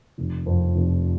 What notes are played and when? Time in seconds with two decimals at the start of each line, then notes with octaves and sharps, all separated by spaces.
0.18 F1
0.46 F2
0.75 F1